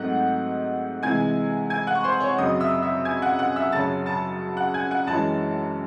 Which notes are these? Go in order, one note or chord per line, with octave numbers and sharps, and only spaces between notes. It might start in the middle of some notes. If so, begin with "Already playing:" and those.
Already playing: G#2 F#3 A3 C4 D#4 F#5
C3 E3 G#3 G#5 G#6
G#5 G#6
F#5 F#6
C#6
C5 C6
C#5 C#6
F#2 C#3 F#3 C4 D#5 D#6
E5 E6
E5 E6
G#5 G#6
F#5 F#6
F#5 F#6
E5 E6
F#2 C#3 F#3 C#4 A5 A6
A5 A6
F#5 F#6
G#5 G#6
F#5 F#6
F#2 E3 G#3 C#4 A5 A6